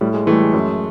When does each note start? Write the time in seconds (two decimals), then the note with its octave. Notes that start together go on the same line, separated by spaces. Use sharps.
0.01 A2 G3
0.14 G#3
0.27 E3 A3
0.31 G3
0.40 G#3
0.54 F#2